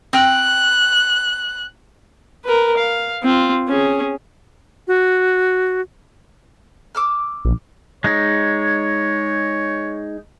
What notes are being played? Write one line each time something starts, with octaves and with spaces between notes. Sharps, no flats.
C4 G5 F#6
A#4 B4
F5
C4 F4
C#4 G#4
F#4
D6 E6 F6
A#1
G#3 D#4 C#5